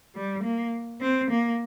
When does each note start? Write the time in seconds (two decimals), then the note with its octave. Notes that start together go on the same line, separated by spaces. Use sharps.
0.16 G3
0.43 A#3
1.01 C4
1.30 A#3